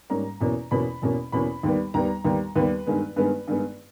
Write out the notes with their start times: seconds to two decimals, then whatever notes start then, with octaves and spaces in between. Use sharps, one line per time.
0.10 G#2 G3 A#3 C#4 A#5
0.41 E2 B2 A#3 C#4
0.71 E2 B2 A#3 C#4 B5
1.02 E2 B2 A#3 C#4
1.32 E2 B2 A#3 C#4 B5
1.63 D#2 D#3 G3 B3
1.94 D#2 D#3 G3 B3 A#5
2.25 D#2 D#3 G3 B3
2.55 D#2 D#3 G3 B3 B4
2.86 G2 D#3 G#3 B3
3.16 G2 D#3 G#3 B3 B4
3.47 G2 D#3 G#3 B3